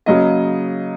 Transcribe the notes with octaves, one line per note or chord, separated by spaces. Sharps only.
C#3 F#3 A#3 D#5